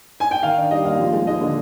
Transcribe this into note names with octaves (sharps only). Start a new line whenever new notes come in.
G#5
G5
D#3 F5
D4
G3 D#5
D#2 F5
F3
G#3
D#2 D#5
D3